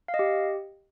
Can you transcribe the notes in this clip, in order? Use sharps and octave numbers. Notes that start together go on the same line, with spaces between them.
F5
D#5
G4